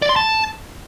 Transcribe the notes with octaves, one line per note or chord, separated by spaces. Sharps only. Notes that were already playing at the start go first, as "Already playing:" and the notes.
D5
C6
A5